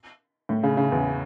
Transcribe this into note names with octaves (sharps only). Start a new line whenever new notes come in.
A2
C#3
C#3
E2